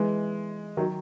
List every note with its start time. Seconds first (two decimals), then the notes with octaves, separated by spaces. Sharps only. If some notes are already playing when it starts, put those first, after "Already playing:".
Already playing: E3 G#3
0.77 D#3 F#3